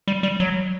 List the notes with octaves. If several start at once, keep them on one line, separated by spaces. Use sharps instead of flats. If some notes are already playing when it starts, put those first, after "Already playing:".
G3
G3
F#3